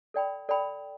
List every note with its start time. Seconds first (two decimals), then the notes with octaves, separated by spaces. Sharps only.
0.14 A4 D5 G5 B5
0.49 A4 D5 G5 B5